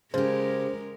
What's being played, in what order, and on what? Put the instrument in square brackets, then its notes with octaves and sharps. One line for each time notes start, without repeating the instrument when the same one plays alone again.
[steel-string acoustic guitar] C#3 G4 [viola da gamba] G#3 A#4 [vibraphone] G#4 [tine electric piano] C5